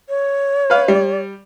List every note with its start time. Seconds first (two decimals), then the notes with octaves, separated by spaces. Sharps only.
0.09 C#5
0.70 B4 F5
0.88 G3